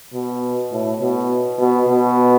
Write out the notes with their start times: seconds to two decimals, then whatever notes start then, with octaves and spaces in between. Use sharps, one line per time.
0.13 B2
0.72 A2
1.01 B2
1.59 B2
1.88 B2